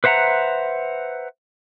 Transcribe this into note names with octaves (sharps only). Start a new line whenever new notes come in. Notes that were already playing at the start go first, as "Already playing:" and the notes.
B4 C5 E5 F#5 A#5